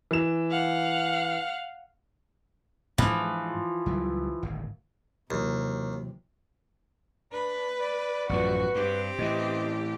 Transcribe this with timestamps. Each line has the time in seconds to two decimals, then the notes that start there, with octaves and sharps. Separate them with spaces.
0.11 E3 E7
0.51 F5 F#5
2.98 G#2 E3 F3 G#3 D4
3.86 C#2 F#3 G3
4.43 D1 G#1
5.31 D#2 C3 E3 F#3
7.32 D4 B4
7.80 D5
8.29 A1 F#2 F3 F#4 B4
8.75 G2 C4 G4
9.18 A2 E3 D#5